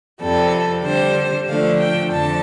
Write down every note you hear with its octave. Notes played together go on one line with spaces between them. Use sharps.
F2 C3 G3 A4
D3 G3 D4 C5
D3 F3 A3 D4 F5
G5
F2 D3 A5